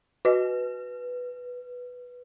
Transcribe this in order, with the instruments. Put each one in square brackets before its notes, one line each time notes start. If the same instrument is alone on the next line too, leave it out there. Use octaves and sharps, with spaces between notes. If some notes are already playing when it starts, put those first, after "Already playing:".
[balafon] F#4 D#5 [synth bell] B4